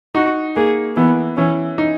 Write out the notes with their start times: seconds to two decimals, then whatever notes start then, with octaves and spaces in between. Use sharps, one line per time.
0.15 D#4 F#4
0.56 A#3 G#4
0.96 E3 B3
1.37 E3 C#4
1.78 D#4